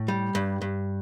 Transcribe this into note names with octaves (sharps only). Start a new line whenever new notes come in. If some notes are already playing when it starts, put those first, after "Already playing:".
Already playing: A2
G3
G2
G2